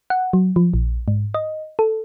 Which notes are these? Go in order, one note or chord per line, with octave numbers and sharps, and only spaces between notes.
F#5
F#3
F3
A#1
G#2
D#5
A4